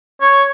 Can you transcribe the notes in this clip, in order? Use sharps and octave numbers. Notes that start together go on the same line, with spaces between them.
C#5